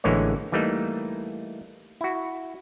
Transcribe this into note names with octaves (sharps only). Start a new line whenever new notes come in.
A1 D3 E3 G#3 A#3 C#5
E3 G3 A3 A#3 D#4
E4 F#4